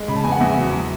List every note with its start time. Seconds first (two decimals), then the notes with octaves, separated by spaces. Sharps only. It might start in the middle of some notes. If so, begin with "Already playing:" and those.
Already playing: G#3
0.08 C#3 B5
0.16 A5
0.24 E2 G#5
0.32 F#5
0.40 E2 E5
0.57 F#3
0.73 F#3